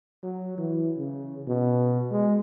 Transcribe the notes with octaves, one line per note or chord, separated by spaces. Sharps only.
F#3
E3
C#3
B2
G#3